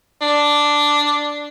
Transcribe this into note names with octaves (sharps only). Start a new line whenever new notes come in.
D4